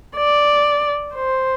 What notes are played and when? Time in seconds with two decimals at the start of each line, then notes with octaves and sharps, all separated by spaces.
0.16 D5
1.15 C5